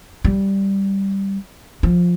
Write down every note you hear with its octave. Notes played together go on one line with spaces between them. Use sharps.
G3
F3